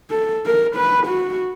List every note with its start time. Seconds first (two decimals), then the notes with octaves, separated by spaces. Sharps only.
0.10 A4
0.46 A#4
0.76 B4
1.07 F#4